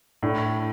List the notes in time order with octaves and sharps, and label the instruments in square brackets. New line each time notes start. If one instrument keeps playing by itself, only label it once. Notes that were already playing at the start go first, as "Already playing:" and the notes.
[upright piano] A2 [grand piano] D4